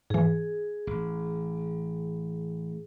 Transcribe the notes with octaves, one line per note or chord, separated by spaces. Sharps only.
G#2 E3 G#4
A1